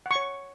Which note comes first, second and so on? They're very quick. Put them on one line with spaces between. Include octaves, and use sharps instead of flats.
F#5 C#6 C#5